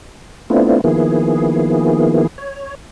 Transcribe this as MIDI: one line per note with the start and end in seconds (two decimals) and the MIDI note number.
0.50 0.81 57
0.50 0.81 59
0.50 0.81 60
0.50 0.81 62
0.50 0.81 64
0.50 0.81 65
0.84 2.27 51
0.84 2.27 53
0.84 2.27 58
0.84 2.27 59
0.84 2.27 64
0.84 2.27 68
2.38 2.75 73